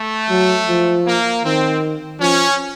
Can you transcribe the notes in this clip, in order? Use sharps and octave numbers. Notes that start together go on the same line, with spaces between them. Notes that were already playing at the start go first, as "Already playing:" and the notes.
Already playing: A3
F#3
F3
A#3
D#3 C4
F3 C#4